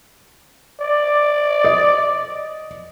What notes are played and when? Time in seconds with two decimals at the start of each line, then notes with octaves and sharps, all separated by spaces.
0.81 D5
1.64 D#5